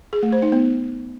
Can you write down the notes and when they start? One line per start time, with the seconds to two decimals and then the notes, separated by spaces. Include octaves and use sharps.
0.13 G#4
0.23 A3
0.32 C5
0.42 D#4
0.52 B3